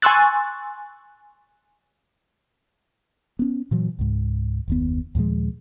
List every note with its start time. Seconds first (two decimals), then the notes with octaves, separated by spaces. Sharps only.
0.02 G#5 C6 C#6 E6 F#6 A6
3.39 B3 C#4
3.71 A#2 E3 F#3
3.99 C#2 G#2
4.68 F#1 D#2 B3
5.15 D#2 A#2 F3 G#3